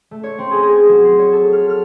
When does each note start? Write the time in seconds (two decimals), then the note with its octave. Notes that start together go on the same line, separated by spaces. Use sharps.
0.11 A3
0.24 C#5
0.39 C4
0.51 G#4
0.63 G#4
0.76 G#6
0.89 F#3
1.05 C7
1.19 C#5
1.33 A4
1.53 F6
1.70 F6